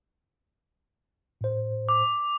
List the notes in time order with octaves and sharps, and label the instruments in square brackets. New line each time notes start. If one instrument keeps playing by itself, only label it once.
[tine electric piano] A2 C5
[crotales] D6